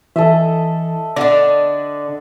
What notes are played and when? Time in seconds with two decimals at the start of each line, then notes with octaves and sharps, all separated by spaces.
0.16 E3 A4 D#5 E5
1.16 D3 D4 D5 D#5 F#5